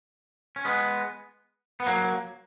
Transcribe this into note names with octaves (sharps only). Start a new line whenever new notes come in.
C#4
G#3 B3
B3
F#3 A#3